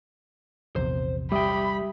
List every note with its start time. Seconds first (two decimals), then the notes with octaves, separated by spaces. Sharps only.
0.76 A#1 E2 C3 C5
1.32 G3 G4 E5 G5 B5 D#6